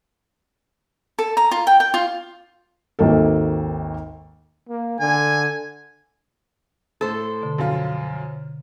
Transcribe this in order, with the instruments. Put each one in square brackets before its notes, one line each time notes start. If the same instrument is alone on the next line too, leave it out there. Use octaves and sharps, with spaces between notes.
[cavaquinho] A4
A#5
F4
G5
G5
F4
[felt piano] G#1 D#2 A#3 A4
[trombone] A#3
[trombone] D3 [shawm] G#5
[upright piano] A2 [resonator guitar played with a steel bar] A4 C5
[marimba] B2 D3
[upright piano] F#2 F3 F4